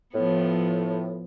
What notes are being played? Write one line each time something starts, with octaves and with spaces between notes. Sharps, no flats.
A2 F3 B3